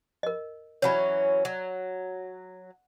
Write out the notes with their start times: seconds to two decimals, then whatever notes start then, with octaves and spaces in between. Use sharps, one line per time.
0.23 A#4 D#5
0.82 E3 F#3 C#4 C#5 B5
1.45 F#3